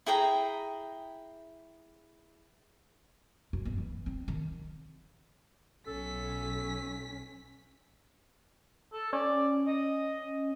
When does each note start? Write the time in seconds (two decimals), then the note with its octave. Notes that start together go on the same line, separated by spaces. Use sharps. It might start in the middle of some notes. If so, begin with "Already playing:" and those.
0.06 E4 G#4 G5 A#5
3.53 F#2
3.65 B3
3.78 E3
4.06 C4
4.28 D#3
5.87 B1 C#4 A4 B6
8.93 A4
9.13 C#4 D5
9.67 D#5